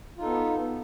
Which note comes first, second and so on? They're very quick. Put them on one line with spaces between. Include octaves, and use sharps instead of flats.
F4 D#4 A4 B3